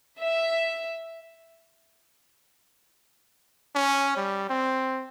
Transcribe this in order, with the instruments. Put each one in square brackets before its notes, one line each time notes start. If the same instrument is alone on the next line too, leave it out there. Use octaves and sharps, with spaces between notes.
[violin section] E5
[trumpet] C#4
G3
C4